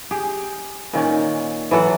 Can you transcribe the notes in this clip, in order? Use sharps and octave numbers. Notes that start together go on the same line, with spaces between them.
G4 G#4
A#2 D#3 C#4 D5
E3 F#3 A4 F#5